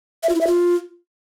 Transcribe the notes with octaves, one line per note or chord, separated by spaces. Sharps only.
E5
F4
E4
E5
F4